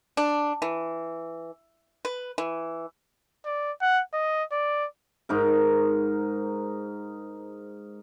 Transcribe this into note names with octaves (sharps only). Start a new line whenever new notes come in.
D4
E3
B4
E3
D5
F#5
D#5
D5
G#2 D#4 A#4